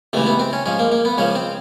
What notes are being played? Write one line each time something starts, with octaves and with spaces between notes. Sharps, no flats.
C#2 C3 E3 A3
B3
C4
C#4
G#2 F3 C#4
A#3
A#3
B3
C#2 C#3 F3 C#4
C4